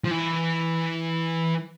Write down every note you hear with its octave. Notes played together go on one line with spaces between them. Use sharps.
F3
E3